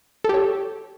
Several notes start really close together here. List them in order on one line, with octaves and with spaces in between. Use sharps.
A4 G4 C#5